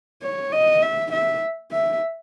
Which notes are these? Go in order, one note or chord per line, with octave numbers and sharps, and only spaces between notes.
C#5
D#5
E5
E5
E5